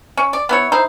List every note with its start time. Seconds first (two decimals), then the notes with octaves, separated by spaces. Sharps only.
0.17 C#4
0.33 D5
0.49 B3 E4 C#5
0.72 D#4 E4 C5